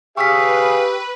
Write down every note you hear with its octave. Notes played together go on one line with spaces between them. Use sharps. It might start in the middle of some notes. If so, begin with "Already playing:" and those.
G4 G#4 B4 F5 C#6 E6 B6